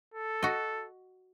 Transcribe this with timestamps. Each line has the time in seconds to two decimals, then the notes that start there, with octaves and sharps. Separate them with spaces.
0.14 A4
0.43 F#4 D#5